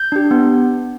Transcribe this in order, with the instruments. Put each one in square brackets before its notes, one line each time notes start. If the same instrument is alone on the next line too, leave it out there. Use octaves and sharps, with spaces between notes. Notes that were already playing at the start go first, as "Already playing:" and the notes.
Already playing: [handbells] G6
D4 G4
B3